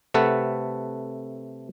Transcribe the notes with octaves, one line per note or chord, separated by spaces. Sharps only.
C3 A3 A4 B4 F#5